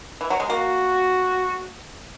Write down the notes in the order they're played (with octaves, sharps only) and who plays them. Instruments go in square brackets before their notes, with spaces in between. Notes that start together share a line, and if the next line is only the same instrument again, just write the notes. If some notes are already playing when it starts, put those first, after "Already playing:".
[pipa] E3
F#3
G#3
[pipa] A#3 [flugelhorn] F#4